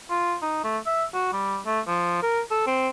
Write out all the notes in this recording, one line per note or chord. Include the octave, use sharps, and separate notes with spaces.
F4
D#4
A3
E5
F#4
G3
A3
F3
A#4
A4
C4